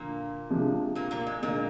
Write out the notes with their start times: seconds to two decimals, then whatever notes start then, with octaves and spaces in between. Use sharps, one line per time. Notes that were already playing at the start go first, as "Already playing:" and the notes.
Already playing: A#2 D3 F3 A#3
0.50 C3 F3 G#3 D4
0.95 A#2 A#3
1.11 A#2 A#3
1.27 G#3
1.42 A#2 D3 G#3 A#3 D#4